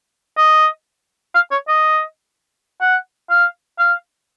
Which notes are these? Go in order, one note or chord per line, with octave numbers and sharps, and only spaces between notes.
D#5
F5
C#5
D#5
F#5
F5
F5